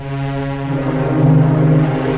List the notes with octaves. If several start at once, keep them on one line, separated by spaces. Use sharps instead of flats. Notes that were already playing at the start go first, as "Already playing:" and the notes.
Already playing: C#3
C3 D#3